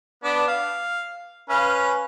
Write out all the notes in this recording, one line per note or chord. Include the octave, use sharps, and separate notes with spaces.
B3 D4
F5
C#4 B4 F5